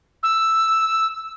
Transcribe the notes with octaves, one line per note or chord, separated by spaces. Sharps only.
E6